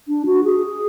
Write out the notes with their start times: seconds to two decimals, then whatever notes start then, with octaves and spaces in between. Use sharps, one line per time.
0.08 D4
0.26 F#4
0.44 G#4